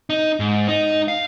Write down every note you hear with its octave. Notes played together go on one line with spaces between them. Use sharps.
D#4
G#2
D#4
F5